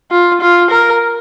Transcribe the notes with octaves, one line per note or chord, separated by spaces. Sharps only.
F4
F4
A#4